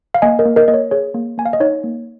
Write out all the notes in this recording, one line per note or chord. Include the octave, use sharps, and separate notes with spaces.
F5
A#3 D#5 G#5
A#4 D#5
A#3
A#4 D#5
A#3 D#5
C#5
G#4 C#5
A#3
A#3 G#5
F5
D#5
D#4 C#5
A#3